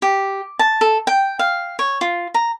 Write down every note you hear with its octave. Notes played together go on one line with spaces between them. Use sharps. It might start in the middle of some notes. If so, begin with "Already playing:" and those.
G4
A5
A4
G5
F5
C#5
F4
A#5